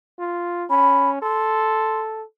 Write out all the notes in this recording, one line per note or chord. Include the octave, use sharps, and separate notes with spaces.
F4
C#4 B5
A4 C6